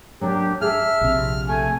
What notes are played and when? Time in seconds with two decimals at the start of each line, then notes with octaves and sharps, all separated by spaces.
0.21 F#3 A#3 D4 G4
0.61 G#4 E5 A5 F6
1.01 A#1 C3
1.48 A3 G#5